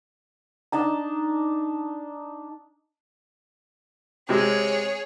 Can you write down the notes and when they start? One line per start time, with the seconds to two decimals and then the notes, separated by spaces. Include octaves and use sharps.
0.72 D4 D#4 A5 A#5
4.29 C3 G#3 G#4 C#5